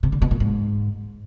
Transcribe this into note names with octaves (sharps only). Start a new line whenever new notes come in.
C3
D3
B2
A#2
G#2